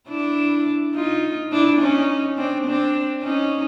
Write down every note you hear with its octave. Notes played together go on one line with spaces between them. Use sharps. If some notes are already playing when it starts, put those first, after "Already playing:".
D4 E4
D#4 F4
D4 E4
C#4 D#4
C4 D4
C4 D4
C#4 D#4